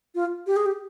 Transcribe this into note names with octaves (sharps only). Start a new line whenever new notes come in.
F4
G4
G#4
G4